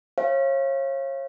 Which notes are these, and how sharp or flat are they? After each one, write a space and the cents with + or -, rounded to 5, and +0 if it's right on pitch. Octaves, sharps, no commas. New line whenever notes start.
C#5 -35 F5 -30